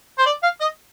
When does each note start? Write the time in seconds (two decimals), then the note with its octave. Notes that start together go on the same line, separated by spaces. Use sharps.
0.18 C5
0.26 D5
0.43 F5
0.61 D#5